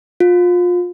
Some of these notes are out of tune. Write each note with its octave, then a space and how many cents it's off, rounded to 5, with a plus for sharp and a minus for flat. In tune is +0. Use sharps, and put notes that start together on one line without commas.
F4 +25